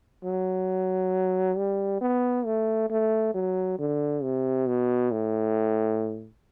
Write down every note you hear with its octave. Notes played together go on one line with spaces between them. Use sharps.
F#3
G3
B3
A3
A3
F#3
D3
C3
B2
A2